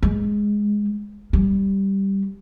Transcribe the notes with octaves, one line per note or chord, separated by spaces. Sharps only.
G#3
G3